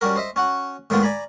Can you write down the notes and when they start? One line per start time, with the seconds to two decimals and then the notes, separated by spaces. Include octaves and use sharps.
0.01 G3 C#4 F#4 A#4
0.16 C5 D#5 E5
0.36 C#4 F#4 F#5
0.90 A2 D#3 G#3 B3 F4 F#4
1.03 D5 G#5 A#5 B5